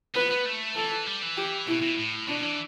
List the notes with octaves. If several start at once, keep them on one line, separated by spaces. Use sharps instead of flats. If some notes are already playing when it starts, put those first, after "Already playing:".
B3 B4
B3
A3
E3 A4
G3
E3
G4
B2 E4
B2
A2
B2 D4
E3